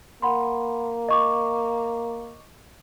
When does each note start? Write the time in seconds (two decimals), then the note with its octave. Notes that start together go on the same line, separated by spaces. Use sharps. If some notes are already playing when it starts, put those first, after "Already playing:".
0.22 A#3 F#5 B5 C6
1.08 D#5 C#6 D6